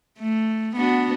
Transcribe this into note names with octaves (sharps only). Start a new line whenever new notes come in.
A3
B3 D4 F#4